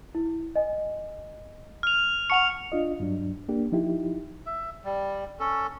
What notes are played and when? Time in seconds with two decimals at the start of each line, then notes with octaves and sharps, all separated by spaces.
0.15 E4
0.56 D#5 G#5
1.83 F6 F7
2.30 F#5 A5 C#6 C#7 F7
2.72 D4 F4 D#5
3.00 G2 F#3 D4
3.49 A#3 D4 G4
3.72 F3 D#4 E4 G4
4.46 E5
4.84 G3
5.40 C#4 A4